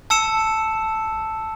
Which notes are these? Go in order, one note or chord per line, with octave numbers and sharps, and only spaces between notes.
A5 E6 C#7 E7